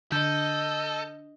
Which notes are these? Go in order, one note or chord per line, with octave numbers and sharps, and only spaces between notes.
D3 A4 D#5 G6